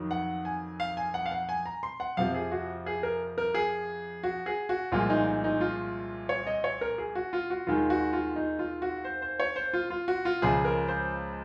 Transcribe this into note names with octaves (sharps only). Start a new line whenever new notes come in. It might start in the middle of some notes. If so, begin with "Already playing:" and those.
Already playing: F2 D#3 F#3
F#5
G#5
F5
G#5
F#5
F5
F#5
G#5
A#5
C6
F#5
F2 C3 F3 F5
G#4
F#4
G#4
A#4
A#4
G#4
F#4
G#4
F#4
C2 A#2 F3 G#3 F4
D#4
D#4
D#4
F4
C#5
D#5
C#5
A#4
G#4
F#4
F4
F#4
D#2 D#3 G#3 F4
F#4
F4
D#4
F4
F#4
C5
C5
C#5
C5
F4
F4
F#4
F4
C#2 C#3 F3 G#3 G#4
A#4
C5